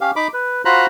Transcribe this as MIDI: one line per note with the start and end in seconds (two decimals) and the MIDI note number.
0.01 0.11 61
0.01 0.11 67
0.01 0.11 77
0.16 0.28 63
0.16 0.28 83
0.16 0.28 86
0.34 0.62 71
0.65 0.86 65
0.65 0.86 66
0.65 0.86 72
0.65 0.86 82
0.65 0.86 83
0.65 0.86 90